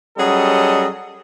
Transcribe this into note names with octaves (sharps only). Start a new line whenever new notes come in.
F#3 G3 C#4 G#4 A4 D#5